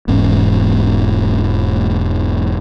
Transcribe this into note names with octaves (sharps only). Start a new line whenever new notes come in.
E1 E2 G#2 C#4